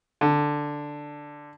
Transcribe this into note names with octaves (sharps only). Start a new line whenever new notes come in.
D3